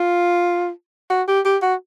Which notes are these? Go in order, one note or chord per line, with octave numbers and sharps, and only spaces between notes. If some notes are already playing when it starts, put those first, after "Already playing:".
Already playing: F4
F#4
G4
G4
F#4